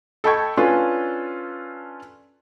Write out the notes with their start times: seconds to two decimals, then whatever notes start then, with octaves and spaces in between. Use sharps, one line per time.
0.24 A4 D#5 G5 B5 C#6 G#6
0.57 C#4 D4 F4 A4 B4